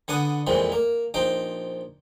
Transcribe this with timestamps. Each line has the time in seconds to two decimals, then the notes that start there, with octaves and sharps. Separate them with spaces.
0.08 D3 B3 D4 F#5 G#5 D#6
0.47 F2 A#2 E3 G#3 C4
0.72 A#3
1.14 A#1 D#4 C5 G5